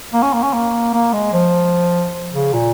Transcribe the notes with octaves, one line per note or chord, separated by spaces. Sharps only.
A#3
C#4
A#3
C#4
A#3
A#3
G#3
F3
C#3
A#2